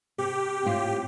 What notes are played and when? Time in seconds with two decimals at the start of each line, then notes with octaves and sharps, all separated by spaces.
0.18 C3 G4
0.65 A2 C4 F4